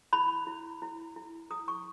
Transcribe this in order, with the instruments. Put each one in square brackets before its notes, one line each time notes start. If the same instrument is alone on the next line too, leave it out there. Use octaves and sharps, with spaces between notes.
[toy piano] E4 B5
E4
E4
E4
E4 D#6
C#6